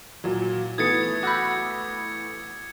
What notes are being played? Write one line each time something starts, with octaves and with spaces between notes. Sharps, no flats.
A#2 F#3
E3 A3 B3 D#6 G#6 A6 C#7
F#4 B5 D6 E6 G6